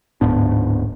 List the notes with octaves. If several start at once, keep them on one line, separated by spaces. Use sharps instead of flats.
D1 G#2 B3 D4